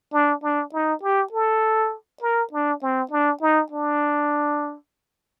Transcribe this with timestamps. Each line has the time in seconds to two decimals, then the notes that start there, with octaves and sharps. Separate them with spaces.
0.13 D4
0.43 D4
0.73 D#4
1.03 G4
1.33 A4
2.22 A#4
2.53 D4
2.82 C4
3.11 D4
3.42 D#4
3.72 D4